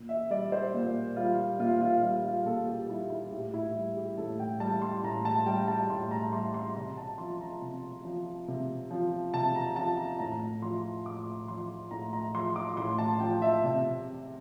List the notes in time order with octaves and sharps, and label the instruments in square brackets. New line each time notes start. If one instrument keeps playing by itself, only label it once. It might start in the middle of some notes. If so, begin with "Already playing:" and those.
Already playing: [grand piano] A#2
E5
G3 D5
C5
A#2
G3 F4
A#2 F4
F4
G3 F4
F4
A#2 A4
G4
G3 E4
E4
A2 G4
E4
G3
G4
A2 A4
G5
G3 A5
C6
A2 A#5
A5
G3 G5
A5
A2 C6
A#5
G3 C6
C6
C3 A#5
A5
F3 C6
A#5
C3
F3
C3
F3
C3 A5
A#5
F3 A5
A#5
A2 A#5
F3 C6
A2 D6
F3 C6
A2 A#5
A#5
F3 C6
D6
A2 C6
A5
F3 G5
E5
C3 E5